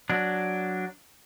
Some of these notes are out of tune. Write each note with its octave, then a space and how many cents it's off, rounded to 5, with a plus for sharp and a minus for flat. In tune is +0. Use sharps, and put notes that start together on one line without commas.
F#3 +0 D4 +0